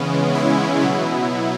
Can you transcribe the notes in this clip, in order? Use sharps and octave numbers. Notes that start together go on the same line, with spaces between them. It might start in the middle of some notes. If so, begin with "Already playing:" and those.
Already playing: C#3 E3 G#3 B3 C#4
E4
B2 F#3 B3